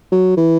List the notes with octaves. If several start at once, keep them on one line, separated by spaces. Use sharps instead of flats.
F#3
E3